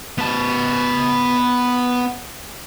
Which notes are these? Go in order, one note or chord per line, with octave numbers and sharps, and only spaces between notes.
B3 A5